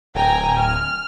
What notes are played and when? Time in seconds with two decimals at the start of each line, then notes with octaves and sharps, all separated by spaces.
0.15 D1 G5 G#5 A#5
0.60 F6